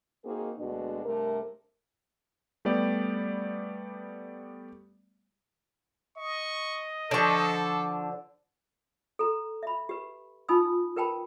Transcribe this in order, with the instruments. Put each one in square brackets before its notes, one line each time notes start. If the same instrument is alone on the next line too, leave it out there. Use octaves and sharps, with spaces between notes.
[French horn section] A#3 C4 D#4 F#4 G#4 A#4
D2 B2 G#3 C4 D4 F#4
G2 C3 A3 A#4
[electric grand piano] G3 A3 B3 G4 D5
[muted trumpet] D#5 [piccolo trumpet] C#6
[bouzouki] D3 F3 [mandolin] D4 C#6 [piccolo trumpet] A4
[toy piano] A4 A#5
E5 B5
G4 B4
D#4 F4 G#5 B5 D#6 E6
A#4 B4 G5 A5 B5